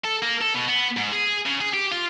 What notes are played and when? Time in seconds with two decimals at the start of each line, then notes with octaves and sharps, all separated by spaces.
0.04 A4
0.22 A#3
0.41 A4
0.54 B2
0.68 B3
0.97 G#2
1.12 G#4
1.46 C#3
1.61 G#4
1.74 G4
1.92 F4